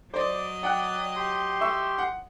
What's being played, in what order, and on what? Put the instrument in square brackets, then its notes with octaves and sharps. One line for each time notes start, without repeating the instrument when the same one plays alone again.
[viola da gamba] F#3 D#5 [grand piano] C5 D5 [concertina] D6
[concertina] D5 [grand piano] F#5 G5 F#6
[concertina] G4 C6
[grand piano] E5 C#6 E6
F#5